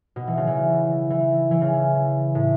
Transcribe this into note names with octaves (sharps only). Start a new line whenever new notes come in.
B2
E3
C#3
E3
E3
E3
C#3
A2